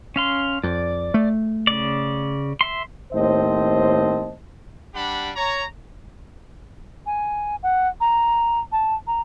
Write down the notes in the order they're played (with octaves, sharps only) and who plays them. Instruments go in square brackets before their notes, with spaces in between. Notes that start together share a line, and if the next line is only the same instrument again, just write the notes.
[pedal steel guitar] C#4 F5 C6
[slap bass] F2 [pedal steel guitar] D5
[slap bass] A3
[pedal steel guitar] C#3 D5
E5 C6
[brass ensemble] D#2 A2 C4 C5 D#5 A5
[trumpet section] G3 D4 G4 F#5 B5
C#5 A#5
[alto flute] G#5
F#5
A#5
A5
A#5